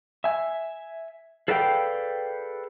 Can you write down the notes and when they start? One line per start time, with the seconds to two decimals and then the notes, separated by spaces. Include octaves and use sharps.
0.24 E5 G#5
1.48 G#4 A4 B4 D5 F5 G5